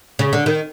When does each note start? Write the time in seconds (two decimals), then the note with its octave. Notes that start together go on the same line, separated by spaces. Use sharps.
0.19 C#3
0.33 D3
0.46 D#3